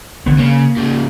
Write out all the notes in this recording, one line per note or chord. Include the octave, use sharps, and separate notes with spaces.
D3 B3
C#3 A#3
G#2 C#3